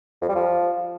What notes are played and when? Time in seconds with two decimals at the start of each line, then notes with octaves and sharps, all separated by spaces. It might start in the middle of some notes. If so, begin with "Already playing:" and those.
0.22 F2
0.29 G3
0.35 F3